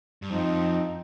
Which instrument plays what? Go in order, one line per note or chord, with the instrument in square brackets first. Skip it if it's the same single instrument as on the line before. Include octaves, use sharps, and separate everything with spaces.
[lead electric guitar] G2
[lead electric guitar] F2 [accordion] F3 C4 D#4